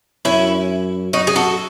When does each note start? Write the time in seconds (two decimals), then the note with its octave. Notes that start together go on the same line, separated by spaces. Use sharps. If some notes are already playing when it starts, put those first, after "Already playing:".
0.25 F#2 C#4 E4
1.13 F#2 D#4 F#4
1.27 G#4
1.36 F#4 A4